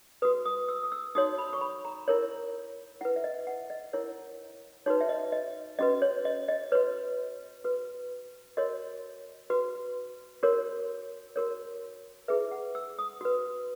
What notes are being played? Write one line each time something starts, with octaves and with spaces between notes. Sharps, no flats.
F#4 B4 D#6
D#6
E6
D#6
E6
D#4 F#4 C#5 D#6
B5
C#6
B5
A#5
E4 A#4 C#5
E4 B4 F#5
E5
D#5
F#5
D#5
E4 A#4 C#5
D#4 F#4 B4 C#5
E5
D#5
D#5
C#4 F#4 B4 D#5
C#5
D#5
D#5
F#4 B4 C#5
F#4 B4
F#4 A#4 C#5 D#5
F#4 B4
F#4 A#4 C#5
F#4 A#4 C#5
E4 G#4 B4 E5
F#5
E6
D#6
F#4 B4